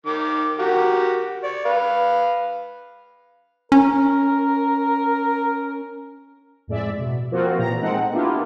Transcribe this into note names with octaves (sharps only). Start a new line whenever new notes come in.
D#3 D6
F#4 G4 A#4
D5 C#6
B4 F5
C#4 A#4
F2 A2 G#3 D5 E5
B2
F3 A#3 C4 F4 F#4
A#2 E3 G4 A#5
G#3 C4 D#4 A4 F#5
A#3 B3 D4 E4 F4 G4